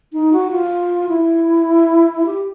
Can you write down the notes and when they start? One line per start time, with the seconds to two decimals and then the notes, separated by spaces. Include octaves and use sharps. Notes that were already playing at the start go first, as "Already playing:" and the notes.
0.13 D#4
0.33 F#4
0.51 F4
1.09 E4
2.26 G4